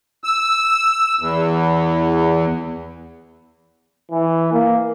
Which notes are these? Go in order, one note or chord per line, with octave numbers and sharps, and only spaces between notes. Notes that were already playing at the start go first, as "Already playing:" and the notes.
E6
E2
E3
A#3